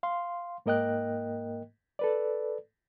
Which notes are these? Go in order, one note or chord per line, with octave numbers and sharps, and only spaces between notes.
F5 C6
G#2 A#3 A#4 D#5 G5 F#6
A4 B4 D5